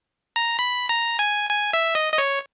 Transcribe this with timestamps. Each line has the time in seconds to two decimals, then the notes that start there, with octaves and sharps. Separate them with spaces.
0.36 A#5
0.59 B5
0.89 A#5
1.19 G#5
1.50 G#5
1.73 E5
1.95 D#5
2.13 D#5
2.18 C#5